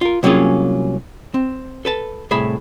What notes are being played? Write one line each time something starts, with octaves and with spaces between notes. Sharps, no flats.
F4 A#4
C2 F#3 A#3 C#4 F4 G#4
C4
A4 B4 A5
C2 A2 G#4 E5 B5